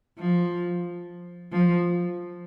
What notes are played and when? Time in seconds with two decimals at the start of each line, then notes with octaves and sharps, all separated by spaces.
0.19 F3
1.52 F3